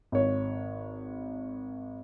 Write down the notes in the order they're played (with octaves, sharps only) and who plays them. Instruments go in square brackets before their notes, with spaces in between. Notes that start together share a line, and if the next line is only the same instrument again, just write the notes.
[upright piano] G#1 C#5